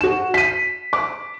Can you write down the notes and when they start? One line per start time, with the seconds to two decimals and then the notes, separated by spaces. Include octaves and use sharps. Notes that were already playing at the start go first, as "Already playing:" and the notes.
0.01 F#4 E7
0.34 B6 D#7
0.93 D6